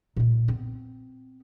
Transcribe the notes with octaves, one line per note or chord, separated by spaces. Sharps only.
A#2 G#3
B3 C4